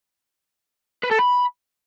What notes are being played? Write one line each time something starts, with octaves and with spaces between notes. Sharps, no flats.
B4
A4
B5